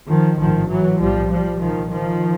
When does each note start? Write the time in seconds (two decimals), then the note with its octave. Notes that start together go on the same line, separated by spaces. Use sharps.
0.09 D#3 F3
0.39 A1 G#2 D#3 F3
0.70 E3 F#3
1.00 B1 A2 F3 G3
1.30 F3 G3
1.60 C2 A#2 D#3 F3
1.91 D#3 F3